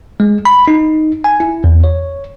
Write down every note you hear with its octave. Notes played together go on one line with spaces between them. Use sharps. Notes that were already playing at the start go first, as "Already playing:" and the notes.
G#3
B5
D#4
G#5
E4
E2
C#5